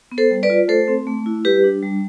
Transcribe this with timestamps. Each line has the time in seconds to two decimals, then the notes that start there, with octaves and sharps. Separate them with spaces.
0.12 B3
0.18 A4 C5
0.31 G3
0.43 B4 D5
0.50 F4
0.68 A3 A4 C5
0.88 C4
1.07 A3
1.26 E4
1.45 G3 G4 B4
1.64 D4
1.83 G3